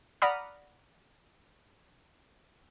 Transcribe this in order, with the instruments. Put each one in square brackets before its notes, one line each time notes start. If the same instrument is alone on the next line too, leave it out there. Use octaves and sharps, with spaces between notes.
[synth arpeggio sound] D5 F#5 A#5 B5 D#6 F6